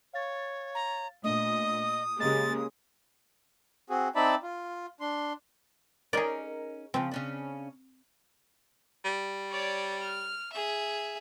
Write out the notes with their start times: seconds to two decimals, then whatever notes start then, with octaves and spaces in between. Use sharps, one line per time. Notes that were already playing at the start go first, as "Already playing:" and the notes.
0.13 C#5 F5 A6
0.75 A#5
1.24 A#2 A3 D4 D#5 D#6
2.20 C#3 G#3 A#3 G4 D#5 A6
3.90 C4 F#4 G#4
4.15 C4 D#4 D5 E5 A5 B5
4.43 F4
5.00 D4 C6
6.13 C#4 D#4 G#4 A#4 D5
6.94 C#3 F3 C4
7.12 C#3 C#4 D4
9.05 G3
9.51 C#5 D5
10.00 F6
10.52 G#4 E5